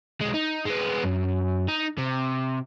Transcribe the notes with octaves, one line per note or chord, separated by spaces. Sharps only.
B1 G#3
D#4
G#3 B3
F#2
D#4
C3